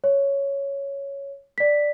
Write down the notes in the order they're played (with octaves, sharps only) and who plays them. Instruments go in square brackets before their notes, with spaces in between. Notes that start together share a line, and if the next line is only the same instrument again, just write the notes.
[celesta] C#5
D5 B6